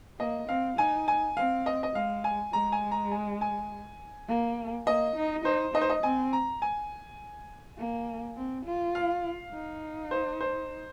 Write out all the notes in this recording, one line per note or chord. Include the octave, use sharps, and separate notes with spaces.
A#3 D#5
C4 F5
D#4 G#5
G#5
C4 F5
D#5
D#5
G#3 F5
G#5
G#3 A#5
G#5
A#5
G#5
G#5
A#3
A#3 D#5
D#4
D#4 C5
D#4 D#5
C5
D#5
C4 G#5
A#5
G#5
A#3
C4
F4
F5
D#4
C5
C5